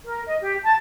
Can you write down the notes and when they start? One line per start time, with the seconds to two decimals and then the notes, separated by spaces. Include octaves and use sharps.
0.04 A#4
0.25 D#5
0.42 G4
0.63 A5